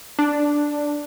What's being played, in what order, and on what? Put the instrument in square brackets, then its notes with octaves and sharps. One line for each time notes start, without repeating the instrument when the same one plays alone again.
[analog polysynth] D4